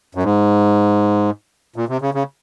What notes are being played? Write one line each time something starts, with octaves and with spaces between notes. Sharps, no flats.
F#2
G#2
A#2
C3
C#3
C#3